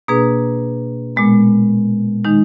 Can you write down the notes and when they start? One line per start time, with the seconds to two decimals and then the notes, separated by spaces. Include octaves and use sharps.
0.08 B2 A#3 D4 G#4 B4
1.16 A#2 G#3 B3
2.25 D#3 G#3 D#4